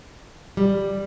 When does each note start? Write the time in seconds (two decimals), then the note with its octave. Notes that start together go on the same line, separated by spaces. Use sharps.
0.57 G3